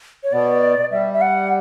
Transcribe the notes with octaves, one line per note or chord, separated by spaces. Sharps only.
C#5
B2 B3 D5
G3 E5
E5
F#5